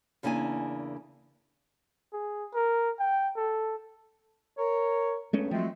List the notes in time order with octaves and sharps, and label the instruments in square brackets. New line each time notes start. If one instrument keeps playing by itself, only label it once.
[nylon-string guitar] E2 C#3 A#3 D4 E4 G#5
[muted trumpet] G#4
A#4
G5
A4
[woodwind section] A#4 C#5
[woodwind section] E2 G2 [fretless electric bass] G#3 A3 C#4
[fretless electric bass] F3 F#3 [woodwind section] G#3 A3 C4